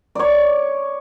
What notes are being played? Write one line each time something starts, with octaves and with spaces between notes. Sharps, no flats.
C#5 D5